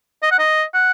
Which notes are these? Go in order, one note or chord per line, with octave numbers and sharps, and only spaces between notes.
D#5
F#5
D#5
F#5